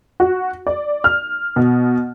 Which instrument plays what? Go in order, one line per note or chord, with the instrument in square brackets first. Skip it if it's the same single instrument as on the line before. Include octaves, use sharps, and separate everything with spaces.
[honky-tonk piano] F#4
D5
F6
B2